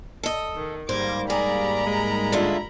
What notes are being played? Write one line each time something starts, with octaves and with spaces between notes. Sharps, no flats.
A4 D#5
D#3
G#2 G3 A#3 C5 D6 G#6 A#6
G#4 A#4 D5 A#5 B5
G#3
D3 E4 F4